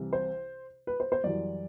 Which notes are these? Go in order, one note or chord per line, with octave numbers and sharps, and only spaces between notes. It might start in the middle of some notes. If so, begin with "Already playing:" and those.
Already playing: C2 C3 E3
C5
B4
C5
C5
F#2 E3 G3 D5